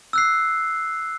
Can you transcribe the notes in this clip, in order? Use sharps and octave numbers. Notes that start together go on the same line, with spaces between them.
E6 F#6 C7